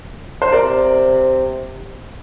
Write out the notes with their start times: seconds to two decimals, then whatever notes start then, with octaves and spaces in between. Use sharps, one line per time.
0.42 C5
0.52 C3 A#4 D5